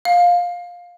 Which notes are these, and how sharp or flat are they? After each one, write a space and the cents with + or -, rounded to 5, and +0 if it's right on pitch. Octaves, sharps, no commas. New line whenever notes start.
F5 +15